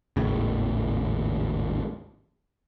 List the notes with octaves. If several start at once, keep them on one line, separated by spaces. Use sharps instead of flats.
G#1 D#2 A2 C#3